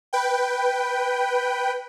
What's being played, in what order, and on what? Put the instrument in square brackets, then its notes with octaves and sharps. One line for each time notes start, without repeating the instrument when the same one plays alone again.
[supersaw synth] B4 G5